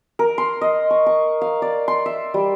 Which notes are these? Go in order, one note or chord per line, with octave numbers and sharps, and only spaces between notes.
A#4
C6
D#5
C#6
C#6
F5
D5
C6
E5
G3